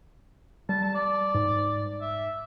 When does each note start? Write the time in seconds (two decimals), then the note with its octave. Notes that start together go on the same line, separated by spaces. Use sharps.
0.69 G3 A5
0.83 A5
0.95 D5
1.35 G#2
2.01 E5